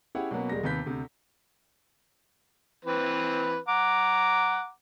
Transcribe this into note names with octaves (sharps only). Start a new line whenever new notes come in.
C#4 E4 G4 G#4 C#5 F#5
B2 F#3 A#3 B3 C#4
E1 G3 G#3 A#6
D#2 C3 B4 G6 B6
D2 C3
E3 C4 B4
F#5 A#5 D6